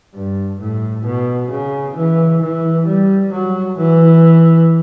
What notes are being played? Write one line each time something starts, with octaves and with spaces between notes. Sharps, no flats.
G2
A2
B2
C#3
E3
E3
G3
F#3
E3